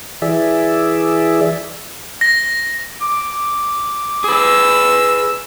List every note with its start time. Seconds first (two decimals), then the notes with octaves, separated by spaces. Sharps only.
0.22 E3 G#4 D5 E5
2.21 A#6
3.01 D6
4.24 G#4 B4 E6